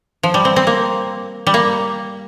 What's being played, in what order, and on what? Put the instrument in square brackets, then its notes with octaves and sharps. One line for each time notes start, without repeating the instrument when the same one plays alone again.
[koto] F3
G3
C4
C4
A#3
G3
A#3